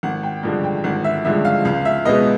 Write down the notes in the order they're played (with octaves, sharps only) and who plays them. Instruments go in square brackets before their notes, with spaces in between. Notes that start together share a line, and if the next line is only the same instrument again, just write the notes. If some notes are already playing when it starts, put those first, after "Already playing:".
[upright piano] G#1 F#5
G5
G2 D3 F3 G#3
G5
G#1 F#5
E5
G2 D3 F3 G#3 E5
F5
C#2 F5
E5
B2 G#3 B3 D#5